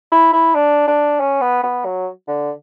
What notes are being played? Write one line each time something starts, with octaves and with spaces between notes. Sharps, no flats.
E4
E4
D4
D4
C#4
B3
B3
F#3
D3